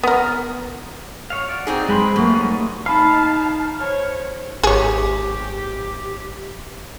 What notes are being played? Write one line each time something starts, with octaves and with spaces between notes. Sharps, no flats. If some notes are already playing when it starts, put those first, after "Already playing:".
B3 A#4
C#5 F5
F#4 D5
C4 D#4 G#4
G#3 B4 B5 C6
F#2 A3 A#3
G3 C#4 D#4
D#4 F5 A5 B5
C5 C#5
G#1 G4 G#4 C#5